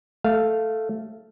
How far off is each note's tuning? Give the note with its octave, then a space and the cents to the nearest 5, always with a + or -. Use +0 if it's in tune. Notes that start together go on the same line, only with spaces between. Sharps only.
A3 +0 F5 -5